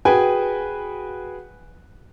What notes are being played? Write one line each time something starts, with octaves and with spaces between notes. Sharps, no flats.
F#4 G#4 B4 G5 G#5